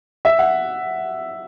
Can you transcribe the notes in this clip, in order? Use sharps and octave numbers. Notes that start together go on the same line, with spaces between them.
E5
F#5